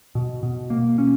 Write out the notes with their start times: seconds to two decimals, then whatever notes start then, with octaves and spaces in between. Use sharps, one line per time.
0.15 B2
0.43 B2
0.70 A#3
0.98 C#4